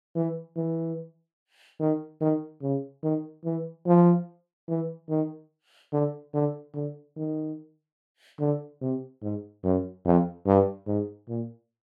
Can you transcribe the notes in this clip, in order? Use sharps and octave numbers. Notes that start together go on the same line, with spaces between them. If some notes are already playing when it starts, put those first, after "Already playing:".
E3
E3
D#3
D#3
C#3
D#3
E3
F3
E3
D#3
D3
D3
D3
D#3
D3
C3
G#2
F#2
F2
G2
G#2
A#2